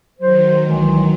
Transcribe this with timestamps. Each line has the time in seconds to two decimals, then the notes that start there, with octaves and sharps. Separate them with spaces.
0.19 D#3 F#3 C5
0.65 C2 E3 G#3